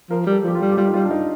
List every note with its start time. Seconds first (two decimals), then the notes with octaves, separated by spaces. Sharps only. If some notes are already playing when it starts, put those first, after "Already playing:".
0.10 F3 A#4
0.27 G3
0.32 A4
0.44 F3 G4
0.55 F4
0.61 G3
0.72 G4
0.77 G3 F4
0.87 D#4
0.94 G3 F4
1.05 D4
1.10 D#4